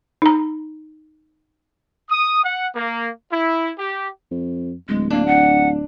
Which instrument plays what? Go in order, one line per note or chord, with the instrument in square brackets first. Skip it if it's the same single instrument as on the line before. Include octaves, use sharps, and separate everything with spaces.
[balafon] D#4 A#5
[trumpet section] D#6
F#5
A#3
E4
G4
[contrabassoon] F2
[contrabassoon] D1 [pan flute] G#3
[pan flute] A#3 [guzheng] D4
[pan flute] F#5